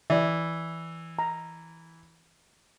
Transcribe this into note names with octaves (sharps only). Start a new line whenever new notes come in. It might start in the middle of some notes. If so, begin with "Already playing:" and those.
E3 D5 E5
A#5